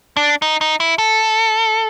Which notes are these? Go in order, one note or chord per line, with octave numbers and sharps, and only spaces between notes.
D4
D#4
D#4
E4
A4